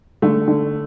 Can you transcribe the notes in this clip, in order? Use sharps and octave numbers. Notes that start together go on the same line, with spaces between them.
D3 A3
D3